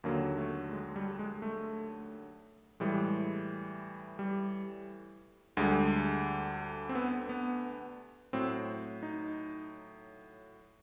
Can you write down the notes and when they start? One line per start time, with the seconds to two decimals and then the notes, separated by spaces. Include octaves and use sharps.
0.04 D#2 D3 F#3 A#3
0.38 A3
0.73 G#3
0.96 G3
1.19 G#3
1.42 A3
2.80 A2 E3 G3 G#3
4.19 G3
5.57 D2 D3 G3 G#3
6.89 C4
6.95 B3
7.29 B3
8.33 A2 F#3 C4
9.03 D#4